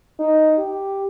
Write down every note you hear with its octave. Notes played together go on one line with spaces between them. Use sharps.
D#4
G4